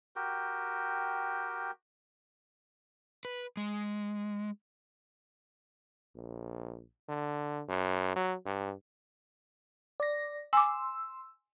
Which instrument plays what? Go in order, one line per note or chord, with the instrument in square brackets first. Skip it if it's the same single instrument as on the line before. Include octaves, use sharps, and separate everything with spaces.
[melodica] F#4 G4 A#4 G5
[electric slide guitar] B4
G#3
[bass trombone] A#1
D3
F#2
F#3
G2
[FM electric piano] D5 A#6
[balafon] G#5 D6 [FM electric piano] C6 E6